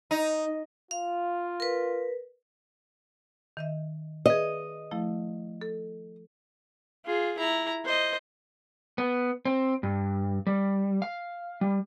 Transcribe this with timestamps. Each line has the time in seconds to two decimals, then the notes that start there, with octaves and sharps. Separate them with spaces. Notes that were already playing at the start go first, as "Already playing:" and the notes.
0.11 D#4
0.91 F4 F5
1.60 A#4 B4
3.57 D#3 D#5 E5
4.26 G#4 B4 D#5
4.91 F3 A3 E4
5.61 A4
7.05 F4 G#4
7.38 E4 A#5
7.85 C5 D#5
8.98 B3
9.45 C4
9.83 G2
10.47 G3
11.02 F5
11.61 G3